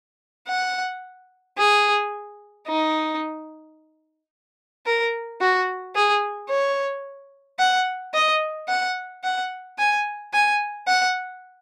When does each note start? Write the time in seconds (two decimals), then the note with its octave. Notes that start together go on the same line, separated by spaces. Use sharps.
0.48 F#5
1.58 G#4
2.67 D#4
4.86 A#4
5.41 F#4
5.95 G#4
6.49 C#5
7.59 F#5
8.14 D#5
8.68 F#5
9.24 F#5
9.78 G#5
10.33 G#5
10.88 F#5